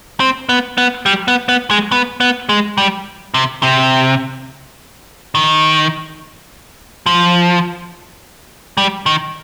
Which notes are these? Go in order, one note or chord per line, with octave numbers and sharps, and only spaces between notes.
C4
B3
B3
G3
B3
B3
G#3
B3
B3
G#3
G3
C3
C3
D#3
F3
G3
D#3